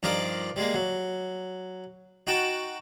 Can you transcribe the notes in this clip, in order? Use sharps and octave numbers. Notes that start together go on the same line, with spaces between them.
G2 F3 D#4 A#4 D5
G3 G#3 A#3
F#3
D#4 F#4 G5 A5